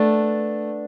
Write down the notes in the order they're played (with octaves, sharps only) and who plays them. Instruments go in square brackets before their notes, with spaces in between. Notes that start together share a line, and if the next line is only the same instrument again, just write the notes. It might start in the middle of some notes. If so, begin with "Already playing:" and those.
Already playing: [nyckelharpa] A3 [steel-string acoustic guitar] B3 D4